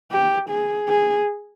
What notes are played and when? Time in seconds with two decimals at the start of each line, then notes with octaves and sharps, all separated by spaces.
0.11 G4
0.49 G#4
0.88 G#4